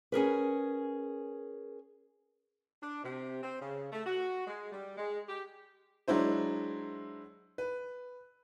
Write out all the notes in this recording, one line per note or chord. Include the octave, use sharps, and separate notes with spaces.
C#4 G#4 A#4 B4
D4
C3
C4
C#3
A3
F#4
G#3
G3
G#3
G4
F#3 G#3 D4 E4 C5
B4